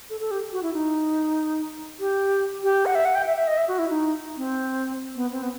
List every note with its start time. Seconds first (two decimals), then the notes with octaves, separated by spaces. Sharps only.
0.10 A4
0.20 A4
0.31 G4
0.52 F#4
0.63 E4
0.73 D#4
2.00 G4
2.63 G4
2.86 F#5
2.95 E5
3.05 F#5
3.15 G5
3.26 E5
3.37 E5
3.47 D#5
3.57 E5
3.68 F#4
3.79 E4
3.90 D#4
4.37 C4
5.15 B3
5.31 C4
5.42 B3